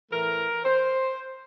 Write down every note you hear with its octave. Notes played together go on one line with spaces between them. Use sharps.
A2 E3 A3 A#4
C5